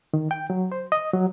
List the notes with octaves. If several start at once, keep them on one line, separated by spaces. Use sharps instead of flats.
D#3
G5
F#3
C5
D#5
F#3